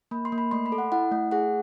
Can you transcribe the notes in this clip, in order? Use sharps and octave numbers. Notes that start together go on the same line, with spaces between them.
A#3 B5
C6
A#3
B5
A3 C6
B5
A4
F#5
E4 F#5
A3
G#4 F#5